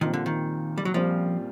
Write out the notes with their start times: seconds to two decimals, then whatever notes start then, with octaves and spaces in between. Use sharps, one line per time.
0.01 A#1 A#2 D#3 G3 C4 F4
0.13 D3
0.26 D#3
0.78 G3
0.85 F#3
0.94 A#1 A#2 F3 G3 C4 F4